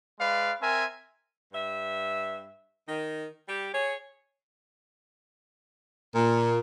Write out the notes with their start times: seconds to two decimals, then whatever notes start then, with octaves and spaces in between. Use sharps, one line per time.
0.19 G#3 B4 D5 F5
0.61 C4 A#4 E5 G#5
1.53 G2 E5
2.88 D#3
3.48 G3 G4
3.74 G#4 C#5
6.14 A#2